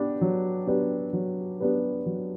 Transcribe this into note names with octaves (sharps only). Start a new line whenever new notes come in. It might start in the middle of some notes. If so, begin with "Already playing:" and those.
Already playing: B3 D4 G4 B4
F#3
B3 D4 G4 B4
F#3
B3 D4 G4 B4
F#3